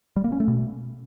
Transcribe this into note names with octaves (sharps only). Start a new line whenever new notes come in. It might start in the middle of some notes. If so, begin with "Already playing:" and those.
G3
A#3
C#4
A3
B2